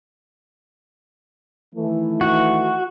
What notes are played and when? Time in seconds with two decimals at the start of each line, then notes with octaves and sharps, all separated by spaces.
1.75 D#3 E3 A3
2.21 F#4